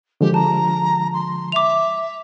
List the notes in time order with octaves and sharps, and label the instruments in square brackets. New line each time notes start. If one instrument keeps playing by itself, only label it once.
[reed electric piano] D3 F3 G#3 [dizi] G4
[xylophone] A5 [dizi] A#5
[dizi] C6
[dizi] E5 [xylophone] D6 F7